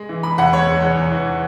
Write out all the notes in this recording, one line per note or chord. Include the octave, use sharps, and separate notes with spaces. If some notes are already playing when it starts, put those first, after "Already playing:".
Already playing: G#3
E3
G#3 B5
E2 F#5
G#3 C#5
G#3
E2
E2
E3